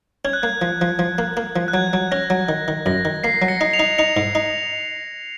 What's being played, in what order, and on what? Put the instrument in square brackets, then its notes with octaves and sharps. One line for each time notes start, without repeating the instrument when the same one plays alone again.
[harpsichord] C#4 [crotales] G#6
[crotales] F#6
[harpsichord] A#3 [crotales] G#6
[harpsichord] F3
F3
F3
A#3
A#3
F3
[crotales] F#6
[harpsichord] F#3 [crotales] G#6
[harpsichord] F#3
[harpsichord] C#4 [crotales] A#6
[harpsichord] F#3
D#3
D#3
[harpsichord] F#2 [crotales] A#6
[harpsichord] D#3
[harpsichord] A#3 [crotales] C7
[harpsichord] F#3
[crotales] A#6 C#7
[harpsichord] D#4
[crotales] C#7 F7
[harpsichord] D#4
[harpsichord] D#4 [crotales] C#7 F7
[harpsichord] G#2
D#4